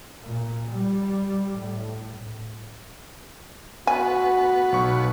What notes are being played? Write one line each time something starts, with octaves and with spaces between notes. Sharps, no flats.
A#2
G3
A2
D2 B2 B3 F#4 B4 G#5
B1 C#6